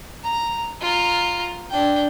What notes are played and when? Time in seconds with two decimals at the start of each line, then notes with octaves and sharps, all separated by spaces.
0.23 A#5
0.81 F4 A#5
1.70 D4 G5